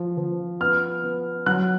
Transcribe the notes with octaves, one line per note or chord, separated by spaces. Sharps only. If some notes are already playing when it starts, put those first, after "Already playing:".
Already playing: F3
F3
B3 F6
B3
F#3 F#6